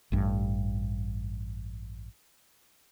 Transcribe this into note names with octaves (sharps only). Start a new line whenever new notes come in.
A1 G2